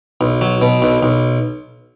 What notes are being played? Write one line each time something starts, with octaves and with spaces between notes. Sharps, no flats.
B1
F#3
B2
B1
B1